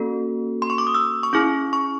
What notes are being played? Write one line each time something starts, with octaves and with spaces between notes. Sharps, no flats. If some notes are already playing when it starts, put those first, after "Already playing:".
Already playing: A#3 C#4 F#4 A4
C6
C#6
D6
D#6
E6
C#6
C#4 E4 G#4 D6
C#6